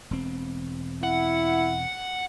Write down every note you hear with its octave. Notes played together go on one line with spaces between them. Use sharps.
E1 C4
E4 F#5